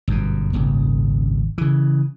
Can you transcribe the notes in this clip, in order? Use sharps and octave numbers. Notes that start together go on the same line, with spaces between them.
G1 F#2 B2
D#1 G#1 D#2 C#3
C#3 E3